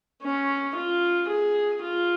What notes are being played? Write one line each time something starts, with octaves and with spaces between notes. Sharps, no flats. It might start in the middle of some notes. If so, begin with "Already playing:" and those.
C#4
F4
G#4
F4